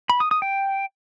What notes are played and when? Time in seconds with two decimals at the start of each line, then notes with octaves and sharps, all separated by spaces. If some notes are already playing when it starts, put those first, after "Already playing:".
0.10 B5
0.20 D#6
0.31 D#6
0.42 G5